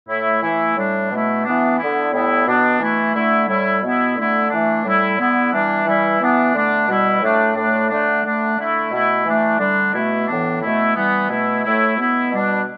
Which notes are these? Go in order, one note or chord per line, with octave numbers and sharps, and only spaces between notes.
A2 A3 E4
E3 A3 E4
A2 G3 D4
B2 A3 E4
E3 B3 D4
D3 B3 E4
A2 G3 B3 E4
B2 B3 D4
E3 A3 E4
D3 A3 E4
A2 G3 E4
B2 B3 E4
D3 A3 E4
E3 A3 D4
A2 G3 E4
D3 B3 E4
E3 G3 D4
E3 G3 E4
E3 B3 D4
D3 A3 D4
B2 G3 E4
A2 A3 D4
A2 A3 D4
D3 A3 D4
D3 A3 D4
D3 A3 E4
B2 A3 E4
E3 A3 D4
D3 G3 D4
B2 A3 E4
A2 E3 B3 D4
B2 A3 E4
E3 G3 B3
B2 A3 E4
A2 A3 E4
B2 B3 E4
B2 G3 D4